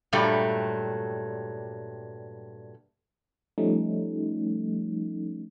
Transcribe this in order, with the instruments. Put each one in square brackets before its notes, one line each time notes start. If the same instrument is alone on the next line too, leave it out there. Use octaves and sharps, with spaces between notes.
[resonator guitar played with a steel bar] G2 A#2 F#3 G3 A3
[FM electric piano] F3 G3 A3 C#4 D#4